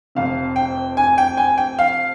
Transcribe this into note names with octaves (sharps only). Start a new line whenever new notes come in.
F1 F2 C3 F5
G5
G#5
G5
G#5
G5
F5